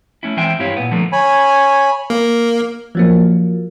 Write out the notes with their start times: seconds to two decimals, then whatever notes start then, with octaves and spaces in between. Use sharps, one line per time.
0.23 A3 C#4 E4
0.37 E3 G#3 C4 E5 G5
0.59 G2 C4 E4 G4 C#5 F5
0.77 A#2 B3
0.91 G2 D3 F3 A3 A#3
1.12 C#5 G#5 B5
2.10 A#3
2.95 F3 F#3 A#3